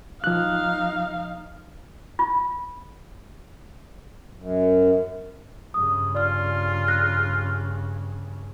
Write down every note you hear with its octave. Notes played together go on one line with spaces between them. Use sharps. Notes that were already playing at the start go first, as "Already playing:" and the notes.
F3 D#4 F5 F#6
F4
F#2
G2 C#3 D#6
F4 D5 F6
F#6 A#6